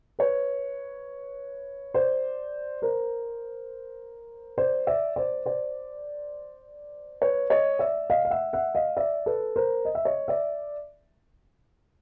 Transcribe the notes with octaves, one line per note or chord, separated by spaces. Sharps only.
B4 C#5
C5 D5
A#4 C5
C5 D5
D5 E5
C5 D5
C5 D5
B4 C#5
C#5 D#5
D5 E5
D#5 F5
F5
E5 F#5
E5 F#5
D#5 F5
D5 E5
A4 B4
A#4 C5
D#5
E5
C#5 D#5
D5 E5